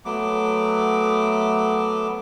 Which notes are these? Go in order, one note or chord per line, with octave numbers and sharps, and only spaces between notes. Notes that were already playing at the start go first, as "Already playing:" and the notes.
F#3 A3 B3 D6